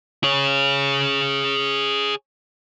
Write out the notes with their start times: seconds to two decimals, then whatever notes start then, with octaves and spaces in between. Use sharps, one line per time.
0.24 G#4 C#5